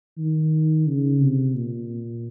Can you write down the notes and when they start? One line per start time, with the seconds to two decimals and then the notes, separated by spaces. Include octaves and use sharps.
0.18 D#3
0.87 C#3
1.21 C3
1.56 A#2